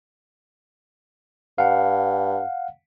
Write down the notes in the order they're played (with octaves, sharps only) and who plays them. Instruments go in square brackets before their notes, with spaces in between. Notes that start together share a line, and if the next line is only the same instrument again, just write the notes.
[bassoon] G2 [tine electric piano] F5 F#5